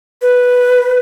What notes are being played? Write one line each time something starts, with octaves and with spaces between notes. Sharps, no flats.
B4